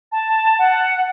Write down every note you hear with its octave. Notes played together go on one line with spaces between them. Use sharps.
A5
F#5